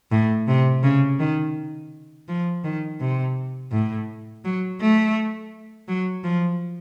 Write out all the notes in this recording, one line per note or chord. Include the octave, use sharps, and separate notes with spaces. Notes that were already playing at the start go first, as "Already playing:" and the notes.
A2
C3
C#3
D#3
F3
D#3
C3
A2
F#3
A3
F#3
F3